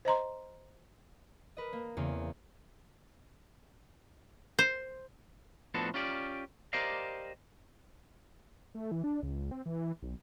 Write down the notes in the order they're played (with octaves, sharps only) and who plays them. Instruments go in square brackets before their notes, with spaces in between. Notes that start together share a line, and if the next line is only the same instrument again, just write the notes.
[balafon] C5 D#5 A#5 C6
[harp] A#4 B4 D#5
A#3
E2 C#3 A#3 C4
[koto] C5
[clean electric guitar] A2 F3 B3 D4 F#4 A4
C#4 F4 G4 D5
G4 A#4 C5 D5 D#5 F5
[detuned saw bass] A3
E3
D4
C#2
C4
E3
B1